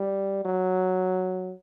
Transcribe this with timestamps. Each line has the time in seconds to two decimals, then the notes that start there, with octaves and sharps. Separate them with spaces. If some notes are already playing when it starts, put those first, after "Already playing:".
Already playing: G3
0.45 F#3